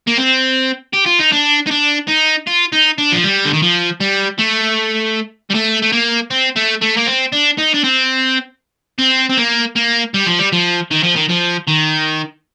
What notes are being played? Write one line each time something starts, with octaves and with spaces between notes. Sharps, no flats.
A#3
C4
G4
F4
D#4
D4
D#4
D4
D#4
F4
D#4
D4
F3
G3
D3
D#3
F3
G3
A3
G3
A3
A3
A#3
C4
A3
A3
A#3
C4
D4
D#4
D4
C4
C4
C4
A#3
A#3
G3
F3
G3
F3
D#3
F3
D#3
F3
D#3